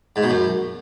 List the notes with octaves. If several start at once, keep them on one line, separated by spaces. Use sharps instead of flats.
G#2
B2
F#2